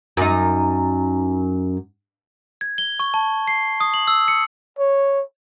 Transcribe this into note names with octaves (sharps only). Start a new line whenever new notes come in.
F#2 D#4
G#6
G7
C#6
A5
C7
D#6
F#7
E6
C#7
C#5